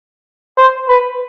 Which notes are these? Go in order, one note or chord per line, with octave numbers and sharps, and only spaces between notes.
C5
B4